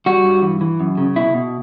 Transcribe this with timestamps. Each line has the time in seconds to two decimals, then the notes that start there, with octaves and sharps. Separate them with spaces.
0.06 G3 F#4
0.24 G2
0.42 E3
0.61 E3
0.80 F#2
0.98 C#3
1.16 B2 E4
1.34 B2